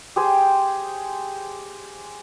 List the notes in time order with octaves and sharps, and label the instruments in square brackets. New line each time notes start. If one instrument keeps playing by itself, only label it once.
[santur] G4 G#4 C5